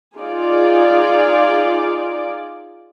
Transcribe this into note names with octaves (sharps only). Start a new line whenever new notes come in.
D#4 F4 G#4 D5